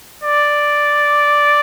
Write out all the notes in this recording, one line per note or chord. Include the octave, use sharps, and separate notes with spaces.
D5